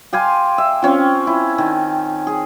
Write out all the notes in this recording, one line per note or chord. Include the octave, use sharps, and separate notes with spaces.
G4 F5 G#5 C6
E5
C4 C#4 F4
E4
D#3
G#4